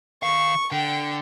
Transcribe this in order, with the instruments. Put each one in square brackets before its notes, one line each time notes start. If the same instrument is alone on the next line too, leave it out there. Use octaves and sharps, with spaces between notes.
[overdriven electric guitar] D#3 F5 [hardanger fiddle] C#6
[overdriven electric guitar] D3 [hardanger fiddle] G5